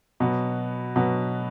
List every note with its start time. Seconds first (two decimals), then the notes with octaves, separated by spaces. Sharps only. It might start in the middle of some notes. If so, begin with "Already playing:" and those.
0.20 B2 F#3 B3
0.96 B2 F#3 B3